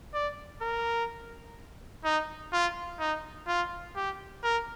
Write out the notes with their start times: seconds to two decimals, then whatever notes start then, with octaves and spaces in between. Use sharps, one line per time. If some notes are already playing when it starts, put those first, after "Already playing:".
0.14 D5
0.61 A#4
2.04 D#4
2.53 F4
2.99 D#4
3.47 F4
3.96 G4
4.43 A#4